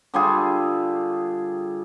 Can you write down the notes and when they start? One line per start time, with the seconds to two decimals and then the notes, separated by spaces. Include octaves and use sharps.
0.14 D3 G3 F4 G#4